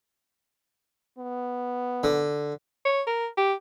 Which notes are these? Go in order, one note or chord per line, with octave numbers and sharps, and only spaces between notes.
B3
D3
C#5
A#4
G4